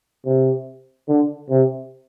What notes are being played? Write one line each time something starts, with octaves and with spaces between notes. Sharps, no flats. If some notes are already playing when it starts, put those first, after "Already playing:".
C3
D3
C3